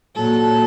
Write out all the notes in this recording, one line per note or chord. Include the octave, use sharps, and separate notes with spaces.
A#2 F#3 A4